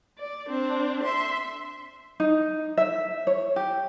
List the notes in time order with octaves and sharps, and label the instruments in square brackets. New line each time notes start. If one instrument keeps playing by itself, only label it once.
[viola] D5
C4 D4
E5 C6
[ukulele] D#4
E5
C#5
G4